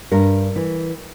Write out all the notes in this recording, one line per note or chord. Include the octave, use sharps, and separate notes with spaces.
G2 A#4
E3